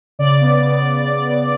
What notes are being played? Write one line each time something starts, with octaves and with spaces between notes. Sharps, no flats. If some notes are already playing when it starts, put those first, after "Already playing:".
C#3 D5
B3
C#3